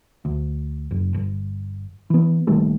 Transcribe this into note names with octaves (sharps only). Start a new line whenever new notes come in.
D2
F#1
G1
E3 B3
A#1 D#3 G3 A3